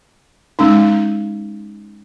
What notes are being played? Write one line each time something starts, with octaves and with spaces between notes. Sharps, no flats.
G#3 C#4 D#4